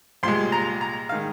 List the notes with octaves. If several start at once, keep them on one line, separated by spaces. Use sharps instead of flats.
C2 A#2 G#3 C6
A#5
A#5
D#3 G#3 F5